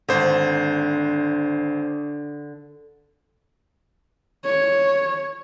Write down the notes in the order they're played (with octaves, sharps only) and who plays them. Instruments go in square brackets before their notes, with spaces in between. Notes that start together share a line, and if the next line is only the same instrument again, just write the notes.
[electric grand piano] G#1 C5 [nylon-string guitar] D3
[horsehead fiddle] C#5